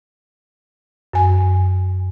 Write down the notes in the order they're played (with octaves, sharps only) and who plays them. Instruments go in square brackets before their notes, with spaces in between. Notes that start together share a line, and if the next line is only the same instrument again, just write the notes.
[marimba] F#2 G#5